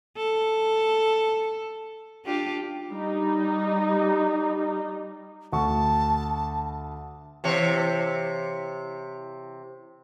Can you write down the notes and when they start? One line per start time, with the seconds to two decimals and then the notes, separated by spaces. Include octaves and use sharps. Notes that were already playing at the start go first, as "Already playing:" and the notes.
0.17 A4
2.25 D4 F4 G4
2.92 G3 D#4
5.53 D2 A5 C#6
7.44 C3 E3 C#5